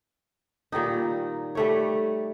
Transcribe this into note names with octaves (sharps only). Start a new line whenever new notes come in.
A#2 D#3 G3 D#4
G3 A3 C#5